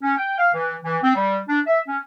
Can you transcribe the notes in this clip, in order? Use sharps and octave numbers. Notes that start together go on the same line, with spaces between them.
C#4
G5
F5
E3
E3
C4
G3
D4
E5
C#4